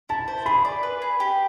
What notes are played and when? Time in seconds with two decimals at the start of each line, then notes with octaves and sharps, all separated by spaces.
0.09 E4 A5
0.28 C5
0.46 G#4 B5
0.65 D5
0.83 B4
1.02 G#4
1.20 G4